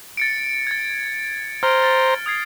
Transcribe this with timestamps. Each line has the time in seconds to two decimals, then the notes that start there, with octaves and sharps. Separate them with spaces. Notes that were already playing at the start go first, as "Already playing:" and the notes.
0.17 A6 C#7 D7
0.67 G#6 A6
1.63 C5 A#5 F6 D7
1.83 A6
2.26 D#6 G#6 C7